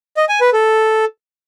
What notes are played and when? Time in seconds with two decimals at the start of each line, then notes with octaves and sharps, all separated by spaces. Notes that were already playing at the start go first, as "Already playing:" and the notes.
0.17 D#5
0.29 G#5
0.41 B4
0.53 A4